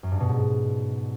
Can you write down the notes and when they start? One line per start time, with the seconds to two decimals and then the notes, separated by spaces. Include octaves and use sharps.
0.03 F#2
0.12 G2
0.20 B2
0.29 G#2